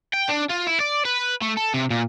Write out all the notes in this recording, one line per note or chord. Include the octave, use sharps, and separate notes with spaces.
G5
D4
F4
E4
D5
B4
A3
A4
C3
A#2